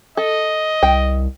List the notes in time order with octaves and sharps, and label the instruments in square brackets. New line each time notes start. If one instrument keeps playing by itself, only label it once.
[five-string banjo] A4 [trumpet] D#5
[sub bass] C2 [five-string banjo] G5